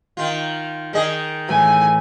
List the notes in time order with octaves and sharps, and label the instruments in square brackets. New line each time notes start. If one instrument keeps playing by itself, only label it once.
[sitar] D#3 F4
D#3 G#4 D#5
[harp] A2 E3 [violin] G#5